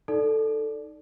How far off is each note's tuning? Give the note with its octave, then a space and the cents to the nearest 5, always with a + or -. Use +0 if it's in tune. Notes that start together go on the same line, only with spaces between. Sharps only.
D#4 +0 A4 +0 D5 +0